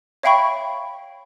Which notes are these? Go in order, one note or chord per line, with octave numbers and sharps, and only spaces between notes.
C#5 E5 F5 G5 B5 C#6